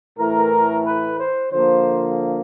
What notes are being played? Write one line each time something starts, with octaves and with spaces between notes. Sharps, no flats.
A2 E3 A3 A#4
B4
C5
D3 F3 A#3 C5